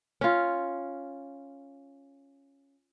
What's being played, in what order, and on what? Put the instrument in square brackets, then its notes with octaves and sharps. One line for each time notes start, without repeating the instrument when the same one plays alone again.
[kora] C#4 F4